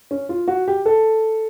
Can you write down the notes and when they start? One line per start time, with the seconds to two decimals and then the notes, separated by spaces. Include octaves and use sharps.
0.11 C#4
0.29 F4
0.48 F#4
0.68 G4
0.86 A4